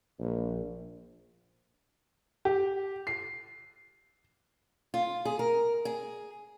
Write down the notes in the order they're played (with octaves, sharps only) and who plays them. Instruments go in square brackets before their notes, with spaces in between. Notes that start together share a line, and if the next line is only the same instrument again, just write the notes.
[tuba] A#1
[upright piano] G4
C7
[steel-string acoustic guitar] F4
G#4
A#4
G#4